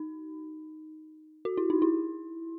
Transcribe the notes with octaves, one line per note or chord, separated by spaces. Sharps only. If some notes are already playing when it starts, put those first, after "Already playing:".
Already playing: D#4
F#4
E4
D#4
E4